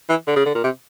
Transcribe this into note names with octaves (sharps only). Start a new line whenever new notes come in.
E3
D3
C#3
D3
A#2
C3